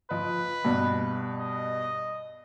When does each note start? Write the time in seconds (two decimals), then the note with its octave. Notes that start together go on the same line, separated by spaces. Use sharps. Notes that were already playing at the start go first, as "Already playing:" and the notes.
0.11 F3 B4 D#5
0.65 G2 B2
1.40 D#5